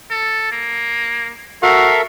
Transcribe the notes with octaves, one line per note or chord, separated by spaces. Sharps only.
A4
A#3
F#4 A4 A#4 E5 F5